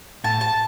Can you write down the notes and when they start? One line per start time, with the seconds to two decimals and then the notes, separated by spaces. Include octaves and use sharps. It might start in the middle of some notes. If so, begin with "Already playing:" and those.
0.24 A2 A5
0.41 A5